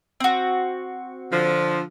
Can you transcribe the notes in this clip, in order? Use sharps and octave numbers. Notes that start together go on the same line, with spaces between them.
C4 F#4
D3 F3